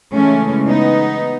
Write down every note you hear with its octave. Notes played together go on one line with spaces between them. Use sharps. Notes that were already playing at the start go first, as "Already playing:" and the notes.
C#3 E3 G#3 A3 C#4
B3 D#4